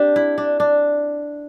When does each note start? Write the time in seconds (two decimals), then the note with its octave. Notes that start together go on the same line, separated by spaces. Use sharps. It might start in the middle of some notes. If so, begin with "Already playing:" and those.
Already playing: C4 D4 G4
0.16 E4
0.38 D4
0.60 D4